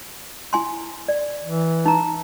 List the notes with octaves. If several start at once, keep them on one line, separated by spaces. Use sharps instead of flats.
E4 G#5 C6
D5
E3
D#4 A#5